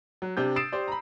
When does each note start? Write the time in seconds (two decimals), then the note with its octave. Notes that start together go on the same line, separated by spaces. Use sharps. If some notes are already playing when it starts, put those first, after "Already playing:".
0.22 F#3
0.37 C3 D4 G4 G6
0.56 D#6 E6 A6 C7 D7 E7
0.72 G4 C5 D5
0.88 A#5 B5